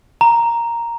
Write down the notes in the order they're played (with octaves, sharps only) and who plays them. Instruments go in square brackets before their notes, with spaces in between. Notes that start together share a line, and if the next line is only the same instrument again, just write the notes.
[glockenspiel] A#5